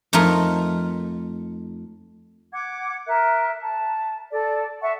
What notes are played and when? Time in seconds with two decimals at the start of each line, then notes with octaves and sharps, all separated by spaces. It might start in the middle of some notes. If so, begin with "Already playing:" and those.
0.13 F2 A3 D#4 F4 A#4
2.52 F#5 D6 G#6
3.07 A#4 E5 F#6
3.61 A5
4.31 A4 D5
4.81 E5 F#5 C#6